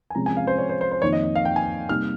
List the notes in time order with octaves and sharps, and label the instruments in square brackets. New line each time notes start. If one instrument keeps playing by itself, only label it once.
[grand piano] G#5
[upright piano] C3 F3 G#3 C#4 [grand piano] A#5
[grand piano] G#5
F5
C5
C#5
C5
C5
C5
[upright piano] F2 D#3 A#3 D#4 [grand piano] C#5
[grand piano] D#5
D#5
F5
G5
G#5
[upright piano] C3 G3 A#3 D#4 [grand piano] F6